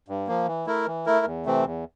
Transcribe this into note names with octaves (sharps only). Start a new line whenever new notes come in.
G2
F3 A#3
E3
A3 E4 A#4
E3
A3 E4 A#4
E2
C3 E3 A3 C4
E2